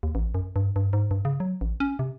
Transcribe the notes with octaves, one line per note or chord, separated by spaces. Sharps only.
D#2
A1
F#2
G2
G2
G#2
G2
C#3
F#3
A1
C#4
C3